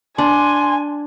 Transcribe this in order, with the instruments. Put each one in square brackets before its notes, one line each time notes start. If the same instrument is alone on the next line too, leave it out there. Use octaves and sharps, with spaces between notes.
[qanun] D4 [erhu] G#5 [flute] C6